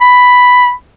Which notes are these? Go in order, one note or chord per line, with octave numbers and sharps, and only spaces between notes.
B5